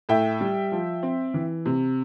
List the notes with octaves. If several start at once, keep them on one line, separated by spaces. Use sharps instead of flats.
A2 E5 G5
G3
F3
C4
E3
C3